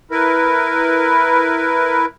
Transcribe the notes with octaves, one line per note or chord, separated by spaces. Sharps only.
E4 A#4 B4